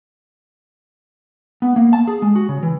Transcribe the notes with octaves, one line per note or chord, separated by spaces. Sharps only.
B3
A#3
A5
G#4
G#3
F#4
C#3
E3